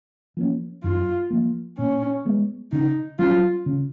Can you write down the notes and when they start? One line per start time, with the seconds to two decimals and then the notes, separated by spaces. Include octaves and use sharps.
0.37 F3 A#3 C#4
0.84 F#2 F4
1.30 F3 A#3
1.78 A#2 C#4
2.25 G#3 B3
2.72 C#3 D#4
3.19 F#3 C#4 F4
3.66 C#3